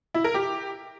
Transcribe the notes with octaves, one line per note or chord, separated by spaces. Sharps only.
E4
A#4
G4